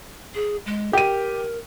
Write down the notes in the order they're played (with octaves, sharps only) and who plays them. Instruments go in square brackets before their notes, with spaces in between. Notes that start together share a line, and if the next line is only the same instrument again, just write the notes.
[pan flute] G#4
G#3
[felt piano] G4 D#7 [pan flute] A#4